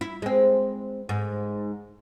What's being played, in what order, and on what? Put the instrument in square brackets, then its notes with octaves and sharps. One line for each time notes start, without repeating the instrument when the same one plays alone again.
[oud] E4
G#3 C4
G#2